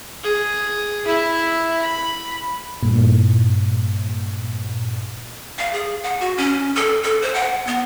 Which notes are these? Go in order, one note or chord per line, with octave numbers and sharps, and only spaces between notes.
G#4
E4 E5
B5
G2 A#2
F5
G#4
F#5
F#4
C#4
A4
A4
C5
F#5
B3